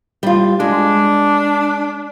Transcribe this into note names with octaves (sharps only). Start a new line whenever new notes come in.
G3 F4
G#3 D4